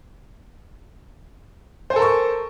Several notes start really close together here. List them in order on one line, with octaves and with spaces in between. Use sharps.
C5 G#5 A4 A#4 C#6